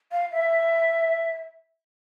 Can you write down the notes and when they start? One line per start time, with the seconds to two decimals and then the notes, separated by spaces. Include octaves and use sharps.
0.12 F5
0.32 E5